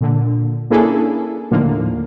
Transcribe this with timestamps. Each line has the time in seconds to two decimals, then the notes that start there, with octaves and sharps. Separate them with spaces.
0.01 A#2 D3
0.70 A#3 C#4 D4 E4 G#4 A4
1.51 D#2 A2 D3 F3 A#3